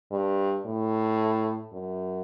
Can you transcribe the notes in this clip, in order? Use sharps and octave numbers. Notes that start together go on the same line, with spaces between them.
G2
A2
F#2